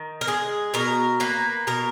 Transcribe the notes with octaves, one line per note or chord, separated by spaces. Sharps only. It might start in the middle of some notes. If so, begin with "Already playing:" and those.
Already playing: D#3
A#4
G#3 G#4
B2 A#4
A#3 B4
B2 A#4